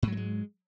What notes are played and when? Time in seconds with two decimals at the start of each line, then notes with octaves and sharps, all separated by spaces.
0.03 G#2
0.07 F#3
0.12 A3
0.17 G#3